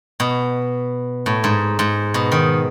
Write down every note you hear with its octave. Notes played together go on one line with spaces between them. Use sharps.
B2
A2
G#2
G#2
B2
D#3